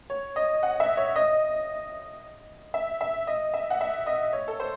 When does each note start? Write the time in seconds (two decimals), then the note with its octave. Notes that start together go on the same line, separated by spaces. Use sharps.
0.10 C#5
0.36 D#5
0.63 F#5
0.80 E5
0.97 C#5
1.16 D#5
2.74 E5
3.01 E5
3.27 D#5
3.54 E5
3.70 F#5
3.81 E5
4.06 D#5
4.33 C#5
4.48 A4
4.60 C5